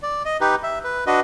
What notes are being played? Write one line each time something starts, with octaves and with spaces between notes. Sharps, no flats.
D5
D#5
D#4 G4 B4
E5
B4
D4 F#4 B4 D#5